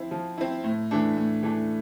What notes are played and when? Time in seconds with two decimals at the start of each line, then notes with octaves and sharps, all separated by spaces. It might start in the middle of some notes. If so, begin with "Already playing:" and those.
Already playing: F3 C4 E4
0.11 F3
0.38 C4 E4
0.64 A2
0.91 E3 A3 D4
1.17 A2
1.43 E3 A3 D4